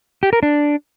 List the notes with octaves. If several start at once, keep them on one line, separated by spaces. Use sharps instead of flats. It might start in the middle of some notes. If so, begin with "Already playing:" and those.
G4
A#4
D4